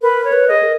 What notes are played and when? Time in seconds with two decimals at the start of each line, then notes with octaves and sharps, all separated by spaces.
0.02 A#4 B4
0.24 C#5
0.32 B4
0.48 G#4 D#5
0.63 A#4